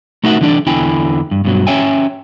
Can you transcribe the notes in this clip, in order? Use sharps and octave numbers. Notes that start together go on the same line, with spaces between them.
A3 D#4 F#4 A#4 E5 F#5
D3 E3 G3 D4 B4 D5
E2 D3 E4 G5 G#5
G2
G2 B2 F#3
C#4 C#5 E5 G5 G#5